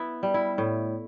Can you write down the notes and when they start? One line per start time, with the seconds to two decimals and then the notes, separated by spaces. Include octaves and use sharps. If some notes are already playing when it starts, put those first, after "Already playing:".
Already playing: B3 E4
0.23 G3
0.34 E4
0.58 A2